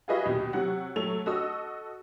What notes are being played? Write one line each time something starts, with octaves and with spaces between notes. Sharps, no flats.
F4 F#4 G#4 B4 D#5 E5
D#2 B2
C3 F#3 F#5
F#3 A3 A4 F7
F#4 A4 D#5 D#6 E6